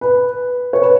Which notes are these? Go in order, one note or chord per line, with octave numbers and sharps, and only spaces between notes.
B4
C#5
B4